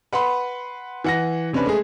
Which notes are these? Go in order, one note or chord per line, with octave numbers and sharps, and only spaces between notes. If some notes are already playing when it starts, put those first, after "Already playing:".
B4 F#5 B5 C6
E3 F#5 A#6
C3 C#4 D4 B4
G#3 A3 G#4